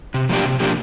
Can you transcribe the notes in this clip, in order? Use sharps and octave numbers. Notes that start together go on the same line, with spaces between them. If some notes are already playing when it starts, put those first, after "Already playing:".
C3
F3 A#3 D4 G4
C3
F3 A#3 D4 G4